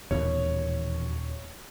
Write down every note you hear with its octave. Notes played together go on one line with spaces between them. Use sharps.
D#1 E2 B2 D#3 C#5